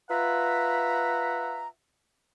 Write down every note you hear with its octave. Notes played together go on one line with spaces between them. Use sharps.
F4 B4 E5 F#5 A#5